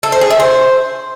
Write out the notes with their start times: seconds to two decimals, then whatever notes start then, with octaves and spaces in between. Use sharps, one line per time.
0.03 A4
0.12 C5
0.21 G#4
0.30 E5
0.40 C5